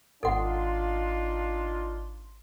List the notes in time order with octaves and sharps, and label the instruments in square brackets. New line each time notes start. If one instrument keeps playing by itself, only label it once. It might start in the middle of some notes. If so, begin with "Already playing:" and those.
[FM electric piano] G#1 C6 [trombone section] D4 D#4 F4 [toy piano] A4 F#5